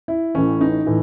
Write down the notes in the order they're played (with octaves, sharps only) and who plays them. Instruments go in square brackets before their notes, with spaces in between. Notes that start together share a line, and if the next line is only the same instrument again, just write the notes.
[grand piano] E4
A1 A2 E3 C#4
D#4
A2 E3